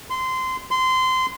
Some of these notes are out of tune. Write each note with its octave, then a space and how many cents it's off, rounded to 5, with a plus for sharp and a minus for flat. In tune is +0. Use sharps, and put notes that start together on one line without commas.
C6 -20
C6 -20